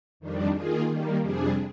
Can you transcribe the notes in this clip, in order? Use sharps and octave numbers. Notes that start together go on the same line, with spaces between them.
F2 D#3 G3 D4
D#3 A#3 F4 G#4
D#3 G3 A#3
F2 C3 G3 D4 G#4